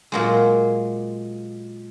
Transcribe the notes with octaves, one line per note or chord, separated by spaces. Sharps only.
A#2 F#3 G#3